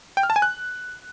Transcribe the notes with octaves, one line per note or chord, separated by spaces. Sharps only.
G5
F6
A5
G#5
F#6